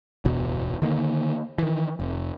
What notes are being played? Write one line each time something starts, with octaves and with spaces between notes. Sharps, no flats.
D1 G1 E2 B2
D3 D#3 A#3
D#3 E3
F1